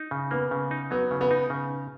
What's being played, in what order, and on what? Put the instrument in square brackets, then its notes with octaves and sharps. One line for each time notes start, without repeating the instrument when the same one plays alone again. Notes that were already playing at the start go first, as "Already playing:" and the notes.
Already playing: [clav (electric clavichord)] D#4
C#3
[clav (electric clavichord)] A#3 [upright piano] B3
[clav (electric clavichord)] C#3
D#4
[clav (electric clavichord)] F#3 [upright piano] B3
[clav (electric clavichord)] C#3
[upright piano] B3
[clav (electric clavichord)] D#4
C#3